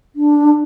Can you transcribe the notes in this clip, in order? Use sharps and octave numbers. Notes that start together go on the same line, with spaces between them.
D4